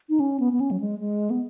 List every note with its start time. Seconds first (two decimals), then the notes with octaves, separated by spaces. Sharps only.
0.09 D#4
0.20 C#4
0.40 B3
0.53 B3
0.60 C#4
0.71 F#3
0.80 G#3
1.00 G#3
1.30 B3